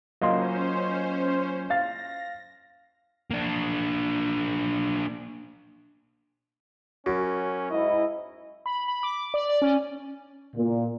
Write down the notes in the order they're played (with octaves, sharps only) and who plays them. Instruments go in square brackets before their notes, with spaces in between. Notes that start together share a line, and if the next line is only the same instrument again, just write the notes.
[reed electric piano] F#3 A#3 F4 [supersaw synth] C#4 C5 [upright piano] D#5 C6
[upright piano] F5 A6 [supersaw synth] A#6
[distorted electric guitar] A#3 D4
[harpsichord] F#2 [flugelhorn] C#4 [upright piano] F#4
[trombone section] G#2 E4 [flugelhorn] D#5
[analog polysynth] B5
B5
D6
D5
D5
C#4
[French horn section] A#2